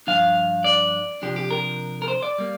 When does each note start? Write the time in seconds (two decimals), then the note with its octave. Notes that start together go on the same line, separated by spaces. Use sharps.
0.07 G2 F3 D4 F5
0.64 D5
1.22 C3 F3 D4 G4
1.36 G4
1.51 A#4
2.02 A#4
2.08 C5
2.23 D5
2.38 G3 A#3